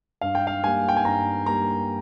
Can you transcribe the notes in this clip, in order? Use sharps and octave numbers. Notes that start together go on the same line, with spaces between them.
G2 F5
G5
F5
G3 A#3 G#5
G5
G#5
G2 A#5
G3 A#3 A#5